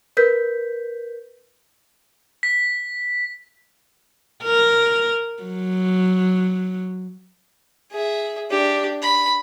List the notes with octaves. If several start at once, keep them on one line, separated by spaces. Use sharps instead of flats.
A#4 B4 G6 B6
B6
A#4
F#3
G#4 E5
D4 G4
B5